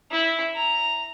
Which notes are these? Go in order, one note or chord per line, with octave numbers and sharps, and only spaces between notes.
E4
A#5